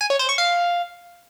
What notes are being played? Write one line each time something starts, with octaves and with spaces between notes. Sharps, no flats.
G#5
C#5
C5
C#6
F5